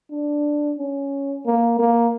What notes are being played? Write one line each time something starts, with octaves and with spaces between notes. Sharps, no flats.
D4
C#4
A#3
A#3